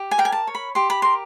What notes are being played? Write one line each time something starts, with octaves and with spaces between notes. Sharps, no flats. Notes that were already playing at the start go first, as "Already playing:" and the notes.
Already playing: G4
G#5
A#4 G5
G#5
A5
C#5
B5
G4 C6
B5
A#4 C6